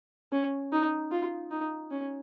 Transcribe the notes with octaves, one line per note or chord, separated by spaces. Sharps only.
C#4
D#4
F4
D#4
C#4